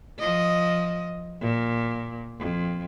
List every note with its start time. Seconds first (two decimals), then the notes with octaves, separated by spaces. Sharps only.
0.18 F3 D#5
1.41 A#2
2.39 F2